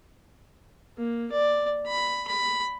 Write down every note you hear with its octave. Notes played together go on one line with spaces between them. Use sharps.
A#3
D5
B5
B5